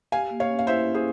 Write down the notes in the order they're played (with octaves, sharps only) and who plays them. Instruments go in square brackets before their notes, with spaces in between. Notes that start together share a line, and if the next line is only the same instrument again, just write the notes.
[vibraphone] G4 [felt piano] F5 G#5
[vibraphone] A#3
[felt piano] C#5 F5
[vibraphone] C#4
[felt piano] F5
[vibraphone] E4 [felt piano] C5 E5
[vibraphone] C#4
[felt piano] G#4 C5